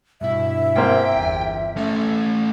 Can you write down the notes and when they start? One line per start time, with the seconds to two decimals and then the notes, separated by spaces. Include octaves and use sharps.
0.21 G2 B2 E4 E5
0.76 G#2 A#3 C4 G5
1.15 G1 E2
1.77 A3 C#4 A4 G#5